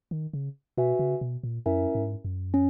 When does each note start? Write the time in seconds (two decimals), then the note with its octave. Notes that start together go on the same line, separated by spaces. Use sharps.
0.11 D#3
0.33 C#3
0.77 B2 F#4 B4 E5 G#5
0.99 C#3
1.21 B2
1.43 A#2
1.66 F#2 C#4 E4 A#4 E5 G#5
1.95 G#2
2.25 F#2
2.54 C#4